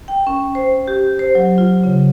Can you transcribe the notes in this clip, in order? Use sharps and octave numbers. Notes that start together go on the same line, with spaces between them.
G5
C#4
C5
G4
C5
F#3
F4
C#3